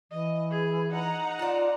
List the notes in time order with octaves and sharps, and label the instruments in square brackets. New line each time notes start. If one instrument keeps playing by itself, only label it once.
[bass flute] E3 [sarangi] D#5
[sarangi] G#4
[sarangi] D#4 [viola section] F#5 A#5
[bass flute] F4 [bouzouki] D5 A5